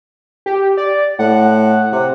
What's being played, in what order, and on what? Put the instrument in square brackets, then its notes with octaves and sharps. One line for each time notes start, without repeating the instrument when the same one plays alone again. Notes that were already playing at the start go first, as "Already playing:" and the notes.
[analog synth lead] G4
D5
[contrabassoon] A2 [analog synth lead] F#5
[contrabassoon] C3